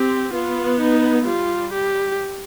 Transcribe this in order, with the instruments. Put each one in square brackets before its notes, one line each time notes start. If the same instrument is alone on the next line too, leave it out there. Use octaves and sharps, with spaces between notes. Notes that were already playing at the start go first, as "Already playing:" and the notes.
Already playing: [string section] C4 [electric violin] G4
[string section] B3 [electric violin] F4
[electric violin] D#4
[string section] G3 [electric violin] F4
[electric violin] G4